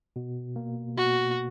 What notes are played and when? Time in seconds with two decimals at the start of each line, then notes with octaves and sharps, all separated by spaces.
0.16 B2
0.56 A#3
0.97 B2 F#4